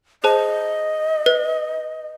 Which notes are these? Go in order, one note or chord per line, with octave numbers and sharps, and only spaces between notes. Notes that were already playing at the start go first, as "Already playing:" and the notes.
G#4 C5 D#5 A5
B4